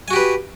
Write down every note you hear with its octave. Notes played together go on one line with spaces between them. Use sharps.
F#4 G4 B4 G#5